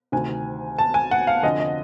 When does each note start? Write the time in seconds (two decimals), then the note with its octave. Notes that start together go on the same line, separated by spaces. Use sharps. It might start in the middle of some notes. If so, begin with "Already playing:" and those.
0.12 D2 C3 D#3 G#5
0.78 A5
0.94 G#5
1.11 F#5
1.27 F5
1.43 F2 D3 D#5
1.60 D#5